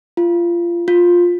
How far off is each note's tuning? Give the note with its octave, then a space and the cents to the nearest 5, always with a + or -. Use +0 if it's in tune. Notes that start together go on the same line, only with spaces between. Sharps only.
F4 -25
F4 +10